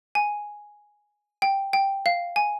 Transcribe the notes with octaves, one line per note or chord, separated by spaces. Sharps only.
G#5
G5
G5
F5
G#5